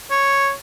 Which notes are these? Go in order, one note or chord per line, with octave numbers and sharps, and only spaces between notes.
C#5